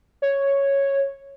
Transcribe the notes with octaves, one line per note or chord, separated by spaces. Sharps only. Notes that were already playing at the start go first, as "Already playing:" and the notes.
C#5